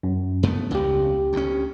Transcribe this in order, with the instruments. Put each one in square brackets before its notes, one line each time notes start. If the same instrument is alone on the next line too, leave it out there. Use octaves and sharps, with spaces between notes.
[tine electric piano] F#2
[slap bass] G2 A3 B3
[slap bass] E1 C#3 [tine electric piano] C#2 G4
[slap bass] D2 C#4